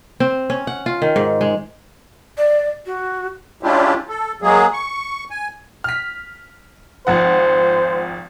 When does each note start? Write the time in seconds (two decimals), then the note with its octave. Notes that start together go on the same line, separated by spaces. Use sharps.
0.20 C4
0.50 C#4
0.67 F#5
0.86 F4
1.02 D#3
1.16 G#2
1.41 G#3
2.38 D5
2.86 F#4
3.63 G#3 C#4 D4 E4 F4 G4
4.09 A4
4.42 F#3 G#3 A#3 G#4
4.73 C#6
5.30 G#5
5.84 F6 B6
7.07 G#1 F3 C5 F#5